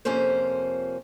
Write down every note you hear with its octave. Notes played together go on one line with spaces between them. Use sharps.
F2 C3 A#3 C#4 C5